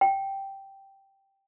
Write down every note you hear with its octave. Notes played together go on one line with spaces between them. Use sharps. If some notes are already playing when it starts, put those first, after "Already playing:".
G5